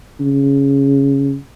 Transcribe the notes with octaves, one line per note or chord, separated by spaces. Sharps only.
C#3